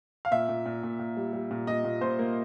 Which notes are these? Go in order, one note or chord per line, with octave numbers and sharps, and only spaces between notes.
F5
A#2 E5
A#2
A#2
A#2
A#2
G3
G3
A#2
A#2 D#5
A#2
A#2 C5
A#3